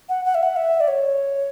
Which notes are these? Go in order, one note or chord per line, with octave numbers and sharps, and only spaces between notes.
F#5
F#5
E5
F#5
E5
D5
C#5